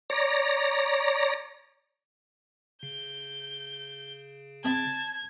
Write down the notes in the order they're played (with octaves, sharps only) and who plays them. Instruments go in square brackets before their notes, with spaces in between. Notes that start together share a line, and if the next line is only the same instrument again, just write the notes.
[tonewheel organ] C#5 D5 A#5 A#6
[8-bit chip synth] C#3 [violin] G6
[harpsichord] C4 D#5 B5 [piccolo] A5 [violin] G#6